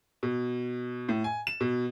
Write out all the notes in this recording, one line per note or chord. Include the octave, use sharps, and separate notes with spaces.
B2
A2
G#5
E7
B2